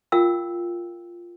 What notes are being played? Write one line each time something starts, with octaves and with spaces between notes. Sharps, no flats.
F4 A#4 F5 G5 E6